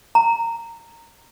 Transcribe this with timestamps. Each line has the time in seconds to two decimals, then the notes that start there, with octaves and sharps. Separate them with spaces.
0.15 A#5